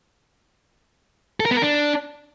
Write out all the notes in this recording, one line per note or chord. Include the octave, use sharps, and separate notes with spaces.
A4
A#4
B3
A#4
D4